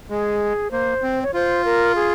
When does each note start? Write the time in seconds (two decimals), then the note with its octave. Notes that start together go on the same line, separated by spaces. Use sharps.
0.10 G#3 G#4
0.71 A#3 C5
1.02 C4
1.23 C#5
1.34 F4 C5
1.65 A#4
1.95 G#4